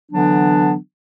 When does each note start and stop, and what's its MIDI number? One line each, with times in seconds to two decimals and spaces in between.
0.12 0.75 50
0.12 0.75 52
0.12 0.75 54
0.12 0.75 59
0.12 0.75 62